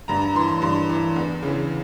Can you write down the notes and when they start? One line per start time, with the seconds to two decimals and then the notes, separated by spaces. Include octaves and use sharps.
0.08 G2 A#5
0.21 A#5
0.35 E3 C6
0.48 C6
0.62 G2 C6
0.89 E3
1.16 E2
1.42 C#3 E3